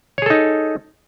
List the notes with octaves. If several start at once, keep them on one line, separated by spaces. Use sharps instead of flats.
D#4 G#4 A4 C#5